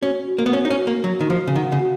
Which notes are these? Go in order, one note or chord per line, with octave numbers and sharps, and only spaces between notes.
C#4 F#4
F#4
A#3
B3
C#4 F#4
D#4
C#4
F#4
A#3
F#3 F#4
D#3
F3 F#4
C#3
D#3 F#5
C#3
F#4